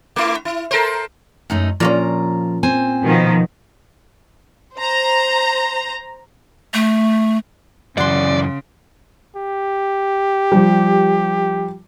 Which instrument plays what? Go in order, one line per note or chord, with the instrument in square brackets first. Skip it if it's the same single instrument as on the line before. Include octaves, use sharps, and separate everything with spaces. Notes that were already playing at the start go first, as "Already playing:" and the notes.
[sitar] A3 E4
E4
A4 A#4 C5
[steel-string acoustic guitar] F#2 A3 D#4
[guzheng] A#2 A#3 C#4 [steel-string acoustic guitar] F3 F4 A#5
[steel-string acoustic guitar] C4 C5 G#5
[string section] B2 D#3 F3
[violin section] C5 A#5
[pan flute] A3
[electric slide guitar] F#2 E3 [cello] C#3 [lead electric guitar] D5 [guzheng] F#5 C6
[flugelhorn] G4
[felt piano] F3 G3